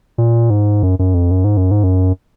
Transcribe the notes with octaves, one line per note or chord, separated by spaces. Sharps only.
A#2
G#2
F#2
F#2
F2
F#2
G#2
F#2
G#2
F#2